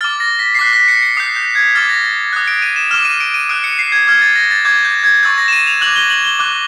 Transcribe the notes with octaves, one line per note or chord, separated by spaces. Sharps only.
D6 F6 A6
A#6
B6
C7
D6 F#6 B6
B6
C#7
C#7
D#6 G6 C7
G6
G#6
D6 F6 A6
A#6
A6
D#6 F#6
D7
D#7
E7
D6 F6 E7
D#7
D7
D#7
D#6 F#6 D7
C#7
C7
G#6
D6 F6 G#6
A6
A#6
A6
D6 G6 G#6
G6
G#6
C#6 E6 G6 A6
A#6
E7
D#7
F7
D6 F#6 F#7
G7
F#7
G7
D6 F#6